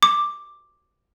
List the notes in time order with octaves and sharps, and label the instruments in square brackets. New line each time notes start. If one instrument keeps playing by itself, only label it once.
[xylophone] D6